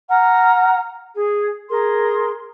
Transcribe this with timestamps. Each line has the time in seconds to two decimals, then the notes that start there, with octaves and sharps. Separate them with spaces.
0.09 F#5 A#5 F6
1.14 G#4
1.67 G#4 A#4 C6